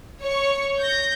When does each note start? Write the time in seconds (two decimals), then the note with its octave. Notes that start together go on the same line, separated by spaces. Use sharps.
0.21 C#5 C#6
0.78 G6 A#6